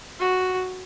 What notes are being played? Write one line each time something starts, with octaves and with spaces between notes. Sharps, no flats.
F#4